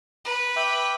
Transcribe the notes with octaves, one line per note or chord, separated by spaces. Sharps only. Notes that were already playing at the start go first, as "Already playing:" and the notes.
B4
E5 G5 D6